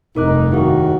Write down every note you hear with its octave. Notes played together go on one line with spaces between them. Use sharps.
F1 G2 D#4 A#4 D6 F#6
D#2 D#3 D#4 E4 F#4 G#4 F5